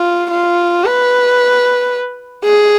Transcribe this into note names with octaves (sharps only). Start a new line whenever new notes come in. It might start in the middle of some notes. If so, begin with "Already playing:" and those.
Already playing: F4
F4
B4
G#4